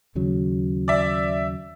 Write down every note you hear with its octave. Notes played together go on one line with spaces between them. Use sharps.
D#2 C#3 F#3
D5 E5